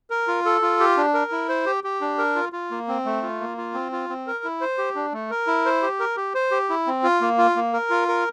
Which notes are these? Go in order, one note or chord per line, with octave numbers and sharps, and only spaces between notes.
A#4
F4
A4
F4
G4
D4
A#4
E4
C5
G4
G4
D4
A#4
F4
F4
A#3
C4
A3
F4
A#3
F4
C4
F4
C4
A#4
E4
C5
G4
D4
A3
A#4
E4
C5
G4
A#4
G4
C5
G4
E4
C4
F4
A#3
F4
A#3
A#4
F4
A#4